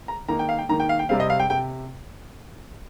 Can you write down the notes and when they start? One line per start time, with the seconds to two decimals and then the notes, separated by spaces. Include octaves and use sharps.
0.08 A#5
0.28 D#3 A#3 D#4 A#5
0.39 G5
0.49 F5
0.58 G5
0.69 D#3 A#3 D#4 A#5
0.80 G5
0.89 F5
0.99 G5
1.09 C3 G3 C4 F5
1.20 D#5
1.30 F5
1.40 G5
1.50 C3 G5